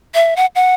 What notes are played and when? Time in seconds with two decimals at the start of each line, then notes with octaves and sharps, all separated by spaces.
0.15 E5
0.36 F#5
0.55 F#5